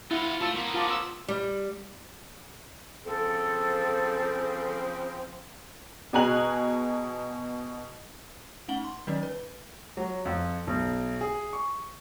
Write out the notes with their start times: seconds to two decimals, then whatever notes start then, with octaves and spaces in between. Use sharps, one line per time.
0.11 E4 F4 F#5
0.41 A3 F4 A5 E6
0.56 A#3 B3
0.74 F4 A5 D6
0.90 E6
1.28 G3
3.05 C#3 F3 C4 A4
6.13 B2 G#4 G#5 A#5 F#6 F#7
8.68 A3 C#4 D#4 F#5 F#7 G7
8.85 C6
9.07 D#3 F#3 G3 C#4 D#4
9.23 B4
9.97 F#3
10.25 F2
10.67 B1
11.21 G#4
11.53 C#6